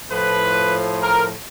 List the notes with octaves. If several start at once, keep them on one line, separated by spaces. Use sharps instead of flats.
A2 F3 B4
A#4